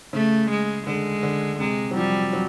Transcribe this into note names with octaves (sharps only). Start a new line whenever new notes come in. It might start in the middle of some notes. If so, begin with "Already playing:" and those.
C#3 A3
G#3
D3 G#3
D3
C3 G#3
F#3
F3 G3
F#3